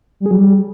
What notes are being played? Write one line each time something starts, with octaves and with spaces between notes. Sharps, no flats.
G3
G#4
F#3
G3